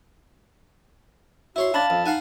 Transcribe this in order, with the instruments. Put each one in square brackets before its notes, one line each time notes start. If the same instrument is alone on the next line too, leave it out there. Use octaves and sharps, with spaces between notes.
[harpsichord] E4 C#5 C6 [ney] F#4
[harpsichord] D4 [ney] F5 [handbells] A5 B5 A6
[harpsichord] F2
[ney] D#4 [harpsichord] F5 F#5 G#5